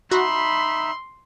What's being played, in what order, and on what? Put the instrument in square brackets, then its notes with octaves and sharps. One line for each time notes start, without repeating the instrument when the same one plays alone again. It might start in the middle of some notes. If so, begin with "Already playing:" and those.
[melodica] D#4 E5 [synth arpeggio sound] F#4 [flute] B5 [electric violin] C6